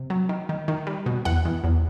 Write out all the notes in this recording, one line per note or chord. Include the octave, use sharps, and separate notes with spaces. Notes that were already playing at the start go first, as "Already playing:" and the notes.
Already playing: C3
F#3
D#3
D#3
D#3
G3
B2
E2 F#5
E2
E2